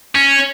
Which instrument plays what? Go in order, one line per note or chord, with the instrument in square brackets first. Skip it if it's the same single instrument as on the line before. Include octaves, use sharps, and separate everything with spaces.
[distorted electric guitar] C#4